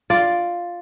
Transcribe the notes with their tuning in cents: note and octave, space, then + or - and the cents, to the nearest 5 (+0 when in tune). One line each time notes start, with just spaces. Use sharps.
F4 +0 D5 +0